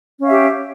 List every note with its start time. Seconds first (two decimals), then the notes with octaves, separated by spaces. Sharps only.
0.19 C#4
0.23 F5
0.27 E5
0.30 G4